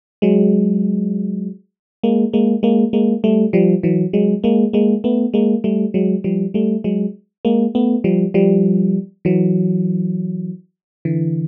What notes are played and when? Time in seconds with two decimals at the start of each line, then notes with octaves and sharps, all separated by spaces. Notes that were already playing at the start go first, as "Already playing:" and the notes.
0.22 F#3 G#3
2.03 G#3 A#3
2.33 G#3 A#3
2.63 G#3 A#3
2.93 G#3 A#3
3.24 G3 A3
3.53 F3 G3
3.83 E3 F#3
4.13 F#3 G#3
4.44 G#3 A#3
4.73 G#3 A#3
5.04 A3 B3
5.34 G#3 A#3
5.64 G3 A3
5.94 F#3 G#3
6.24 F3 G3
6.54 G3 A3
6.84 F#3 G#3
7.45 G#3 A#3
7.75 A3 B3
8.04 F3 G3
8.34 F3 G3
9.25 E3 F#3
11.05 D3 E3